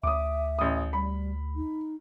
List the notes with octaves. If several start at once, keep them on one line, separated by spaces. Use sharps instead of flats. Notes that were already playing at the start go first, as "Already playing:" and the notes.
D2 E5 D6 D#6
A1 D#6
G3 B5
D#4